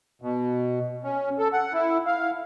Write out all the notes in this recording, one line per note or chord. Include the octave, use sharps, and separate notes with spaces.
B2
C#4
A4
F#5
E4
F5